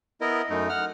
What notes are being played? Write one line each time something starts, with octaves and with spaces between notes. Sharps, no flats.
B3 E4 A#4 D#5
F#2 A3 D#4
F#5 F6